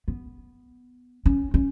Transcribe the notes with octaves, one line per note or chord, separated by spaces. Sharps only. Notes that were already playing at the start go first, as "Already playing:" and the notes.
B3
C#4
C#4